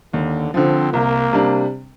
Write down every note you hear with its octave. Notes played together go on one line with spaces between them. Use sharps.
D#2 D3
D3 F3 C4
C2 A#3
C3 G3 D4